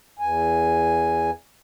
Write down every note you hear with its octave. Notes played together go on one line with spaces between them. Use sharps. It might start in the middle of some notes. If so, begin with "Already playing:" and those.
E2 G#5